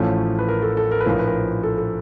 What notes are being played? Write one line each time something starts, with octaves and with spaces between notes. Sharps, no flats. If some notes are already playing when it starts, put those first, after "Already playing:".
Already playing: A1 A2 F3 A3 C#4
B4
A#4
A4
A4
A#4
B4
A#1 A2 F3 A#4
B4
A#4
A4
A4